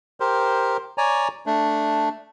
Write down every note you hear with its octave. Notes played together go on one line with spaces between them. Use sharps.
G4 A#4 C5
C#5 D5 G#5 A#5
A3 D4